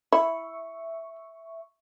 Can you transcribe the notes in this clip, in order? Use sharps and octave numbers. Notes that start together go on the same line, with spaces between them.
E4 E5 C#6